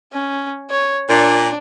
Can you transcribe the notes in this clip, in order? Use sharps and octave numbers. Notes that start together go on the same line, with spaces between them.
C#4
C#5
A#2 D4